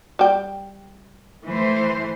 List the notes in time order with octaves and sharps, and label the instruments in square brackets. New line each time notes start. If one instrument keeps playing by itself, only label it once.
[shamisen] G3 G5
[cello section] E3 A3 C5